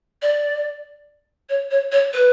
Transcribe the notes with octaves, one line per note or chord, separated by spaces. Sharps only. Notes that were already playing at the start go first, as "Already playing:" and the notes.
D5
C#5
C#5
C#5
B4